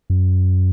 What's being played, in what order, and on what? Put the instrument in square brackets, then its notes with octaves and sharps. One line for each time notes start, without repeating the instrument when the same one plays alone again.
[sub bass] F#2